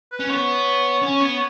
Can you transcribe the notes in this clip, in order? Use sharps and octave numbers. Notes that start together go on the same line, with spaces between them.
B4
C#4
B3 C#5
C#4
B3